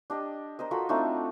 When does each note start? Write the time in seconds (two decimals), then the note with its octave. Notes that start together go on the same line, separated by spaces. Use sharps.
0.10 D4 G4 D#5
0.59 A#4 C5 D#5
0.71 F4 F#4 A4 B5
0.89 A3 C4 D4 D#4